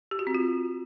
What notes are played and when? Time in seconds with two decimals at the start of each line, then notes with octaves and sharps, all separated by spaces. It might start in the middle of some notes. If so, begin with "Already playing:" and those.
0.11 G4
0.19 F#4
0.27 C4
0.35 F4